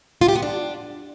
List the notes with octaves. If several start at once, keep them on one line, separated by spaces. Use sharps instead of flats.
F4
G4
B3
D4